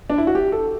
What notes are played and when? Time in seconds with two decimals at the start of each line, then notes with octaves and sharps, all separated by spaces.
0.10 D4
0.18 E4
0.27 F#4
0.35 G4
0.52 A4